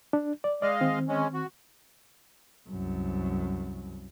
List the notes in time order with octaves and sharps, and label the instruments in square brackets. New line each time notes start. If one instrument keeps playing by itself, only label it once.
[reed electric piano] D4
D5
[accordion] G#3 D#5 F5 [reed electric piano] D5
[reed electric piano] D#3 C4
[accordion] G#3 C#4
F#4
[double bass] C2 F#2